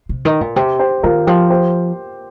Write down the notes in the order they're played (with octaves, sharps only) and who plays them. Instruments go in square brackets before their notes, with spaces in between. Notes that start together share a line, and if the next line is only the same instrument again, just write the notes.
[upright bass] C3
D#3
A#2
[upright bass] C3 [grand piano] G4
[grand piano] G4 C5
[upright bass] D#3 [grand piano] F4 A#4
[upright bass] F3 [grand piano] G4
[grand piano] G4 C5